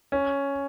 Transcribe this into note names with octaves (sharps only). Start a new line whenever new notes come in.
C#4